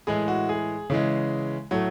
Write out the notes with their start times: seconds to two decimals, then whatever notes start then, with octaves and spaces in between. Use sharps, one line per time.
0.07 A2 E3 G#3 G#4
0.28 F#4
0.49 G#4
0.90 C#3 E3 G#3
1.71 A2 F#3 A3